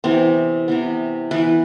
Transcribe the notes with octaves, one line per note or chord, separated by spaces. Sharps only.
C3 E3 B3 C4
C3 E3 B3
E3 B3 B4